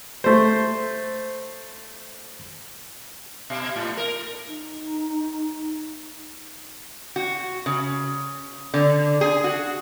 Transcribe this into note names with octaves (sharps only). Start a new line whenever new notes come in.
A3 C5
B2
A2
A#4
D#4
F#4
C#3
D3
G#4
F#4